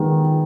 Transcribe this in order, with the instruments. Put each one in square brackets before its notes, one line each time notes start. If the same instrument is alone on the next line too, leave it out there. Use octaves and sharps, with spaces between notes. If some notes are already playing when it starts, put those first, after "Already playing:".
Already playing: [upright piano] D#3 G#3 B3